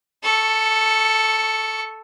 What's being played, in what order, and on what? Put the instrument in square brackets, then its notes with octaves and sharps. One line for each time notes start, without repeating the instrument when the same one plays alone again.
[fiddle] A4 C#6